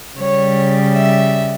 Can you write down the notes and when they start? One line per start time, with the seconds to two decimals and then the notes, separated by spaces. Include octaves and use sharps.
0.17 C#3 G3 C#5
0.95 E5